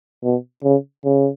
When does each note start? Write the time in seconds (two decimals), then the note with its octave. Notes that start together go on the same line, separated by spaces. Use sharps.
0.23 B2
0.63 C#3
1.05 C#3